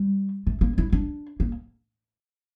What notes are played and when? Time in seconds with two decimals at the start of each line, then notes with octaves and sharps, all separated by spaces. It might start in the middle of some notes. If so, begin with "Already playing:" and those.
Already playing: G3
0.47 A3
0.61 A#3
0.78 E4
0.92 D4
1.40 A#3